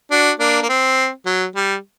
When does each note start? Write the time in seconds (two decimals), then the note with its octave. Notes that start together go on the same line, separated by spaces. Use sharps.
0.11 D4 F#4
0.39 A#3 D4
0.62 A#3
0.69 C4
1.26 F#3
1.55 G3